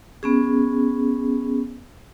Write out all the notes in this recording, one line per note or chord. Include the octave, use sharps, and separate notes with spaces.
B3 C#4 G#4